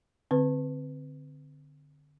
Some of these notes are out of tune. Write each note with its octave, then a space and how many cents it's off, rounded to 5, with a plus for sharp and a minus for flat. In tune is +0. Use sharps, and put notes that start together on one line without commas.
D3 +0 C4 +0 B4 +10